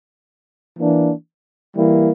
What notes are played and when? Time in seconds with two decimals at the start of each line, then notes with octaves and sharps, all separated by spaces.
0.77 E3 A#3 D4
1.75 E3 G3 A#3 E4